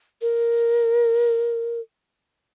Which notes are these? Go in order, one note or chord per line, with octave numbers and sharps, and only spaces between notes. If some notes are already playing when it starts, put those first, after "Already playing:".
A#4